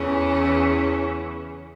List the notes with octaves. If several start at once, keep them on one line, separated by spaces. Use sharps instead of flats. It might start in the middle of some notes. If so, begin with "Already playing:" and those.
Already playing: E2 C#3 E3 C#4